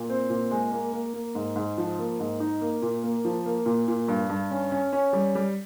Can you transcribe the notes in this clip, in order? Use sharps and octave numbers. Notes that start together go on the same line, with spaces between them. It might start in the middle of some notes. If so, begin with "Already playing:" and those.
Already playing: A#2
C4
A#2
G#3
A#3
A#3
A#3
G#2
G#2
F3
A#3
G#2
D#4
A#3
A#2
A#3
F3
A#3
A#2
A#2
G2
G2
C#4
C#4
C#4
G3
G3